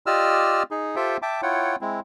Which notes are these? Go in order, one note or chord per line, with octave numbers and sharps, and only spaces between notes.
F4 G4 D5 D#5 E6 F6
D#4 G#4
F4 G4 A4 C5 E5 G5
E5 G5 A5 D6
E4 F4 C#5 F#5 G5
G#3 C4 E4